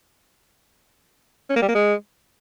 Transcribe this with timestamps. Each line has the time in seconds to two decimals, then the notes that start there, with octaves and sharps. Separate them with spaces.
1.50 C#4
1.56 A#3
1.62 G3
1.68 A#3
1.75 G#3